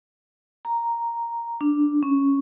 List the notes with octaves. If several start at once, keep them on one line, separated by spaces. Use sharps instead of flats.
A#5
D4
C#4